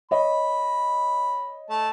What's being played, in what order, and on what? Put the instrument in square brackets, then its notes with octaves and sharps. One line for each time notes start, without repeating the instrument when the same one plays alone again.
[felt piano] C#5 D#5 [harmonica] B5
[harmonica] A3 A5